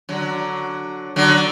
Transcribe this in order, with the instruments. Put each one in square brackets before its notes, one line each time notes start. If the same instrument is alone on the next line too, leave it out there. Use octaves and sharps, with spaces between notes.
[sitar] D3 F#3
D3 F#3